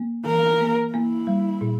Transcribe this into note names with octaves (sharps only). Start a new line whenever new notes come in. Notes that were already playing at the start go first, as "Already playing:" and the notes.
Already playing: A#3
E3 A#4
A#3
A#3 E4
G3
A#2